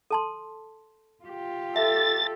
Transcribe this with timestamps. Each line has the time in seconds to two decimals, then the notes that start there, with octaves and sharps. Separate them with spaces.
0.11 A4 A5 C6
1.25 F4 G4
1.76 A4 E5 A6